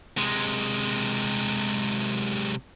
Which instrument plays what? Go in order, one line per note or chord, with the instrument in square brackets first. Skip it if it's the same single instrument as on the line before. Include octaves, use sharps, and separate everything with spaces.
[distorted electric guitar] C3 G#3